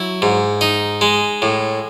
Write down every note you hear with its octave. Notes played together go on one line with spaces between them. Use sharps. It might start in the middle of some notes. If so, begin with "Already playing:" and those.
Already playing: F#3 E4
G#2
D#4
G#3
A2